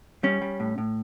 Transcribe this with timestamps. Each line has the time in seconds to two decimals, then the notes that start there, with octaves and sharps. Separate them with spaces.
0.23 G3 C#4
0.41 G3
0.60 A2
0.78 A2